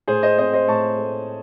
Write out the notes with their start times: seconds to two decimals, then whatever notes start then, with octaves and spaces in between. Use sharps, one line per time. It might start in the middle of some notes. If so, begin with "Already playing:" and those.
0.08 A2 G#4 C5
0.23 C5 D#5
0.38 C4 C5 D#5
0.54 C5 D#5
0.68 A2 A5 C#6
0.99 A3